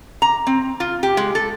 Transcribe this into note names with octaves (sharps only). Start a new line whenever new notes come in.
A#5
C4
F4
G4
G#3
A4